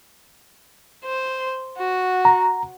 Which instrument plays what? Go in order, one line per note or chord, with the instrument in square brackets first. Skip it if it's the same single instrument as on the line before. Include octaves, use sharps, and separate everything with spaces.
[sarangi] C5
F#4
[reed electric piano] A#5